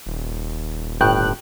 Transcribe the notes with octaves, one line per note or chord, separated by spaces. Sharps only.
D#1
G1 A2 G5 F#6